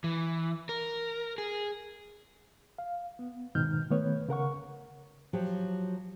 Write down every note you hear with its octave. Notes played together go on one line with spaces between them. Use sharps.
E3
A#4
G#4
F5
B3
G#2 B2 D#3 D#4 F6 G6
D#3 A3 B3 B4 C#5
C#3 A#4 F#5 C#6
F3 F#3 G4